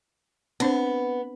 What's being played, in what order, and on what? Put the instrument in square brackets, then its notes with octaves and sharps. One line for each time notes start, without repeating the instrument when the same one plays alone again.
[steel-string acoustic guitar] B3 [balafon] C4 D4 C5